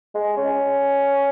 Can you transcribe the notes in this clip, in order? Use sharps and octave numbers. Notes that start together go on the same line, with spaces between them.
G#3
C#4